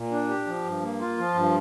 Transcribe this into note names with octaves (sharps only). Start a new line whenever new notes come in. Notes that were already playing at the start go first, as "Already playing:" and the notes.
Already playing: A#2
D4
G4
F3
G2
A#3
F4
F3
G2